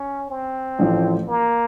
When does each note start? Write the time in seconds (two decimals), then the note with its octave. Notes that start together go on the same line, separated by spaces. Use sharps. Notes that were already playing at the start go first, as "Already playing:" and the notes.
Already playing: C#4
0.30 C4
0.79 A1 A2 F3
1.29 A#3